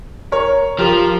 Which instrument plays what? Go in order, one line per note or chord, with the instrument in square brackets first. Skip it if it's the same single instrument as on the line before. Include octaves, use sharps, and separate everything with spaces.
[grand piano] A#4 C#5
[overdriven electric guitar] F3 [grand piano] G4 A#4